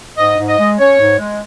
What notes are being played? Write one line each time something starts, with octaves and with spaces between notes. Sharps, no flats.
G#2 D#5
G#2
D#5
G#3
C#4 C#5
G#2
G#3